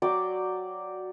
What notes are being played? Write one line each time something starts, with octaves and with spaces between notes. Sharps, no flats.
F#3 D5 G5 D6